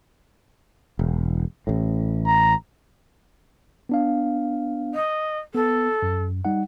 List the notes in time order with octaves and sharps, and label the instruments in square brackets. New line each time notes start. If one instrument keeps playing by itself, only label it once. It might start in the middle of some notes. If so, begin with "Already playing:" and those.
[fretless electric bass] E1
A1 A2
[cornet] A#5
[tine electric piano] B3 D4 F5
[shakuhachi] D#5
[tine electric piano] B3 [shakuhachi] A4
[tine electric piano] F#2
G3 D#4 F#5